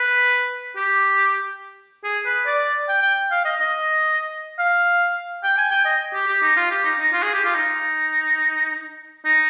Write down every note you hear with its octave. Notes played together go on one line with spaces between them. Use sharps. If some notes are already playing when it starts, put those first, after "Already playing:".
Already playing: B4
G4
G#4
B4
D5
G5
G5
F5
D#5
D#5
F5
G5
G#5
G5
D#5
G4
G4
D#4
F4
G4
D#4
D#4
F4
G#4
G4
F4
D#4
D#4